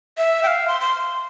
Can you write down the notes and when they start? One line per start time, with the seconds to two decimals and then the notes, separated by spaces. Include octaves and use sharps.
0.18 E5
0.43 G5
0.47 F5
0.68 C6
0.81 C6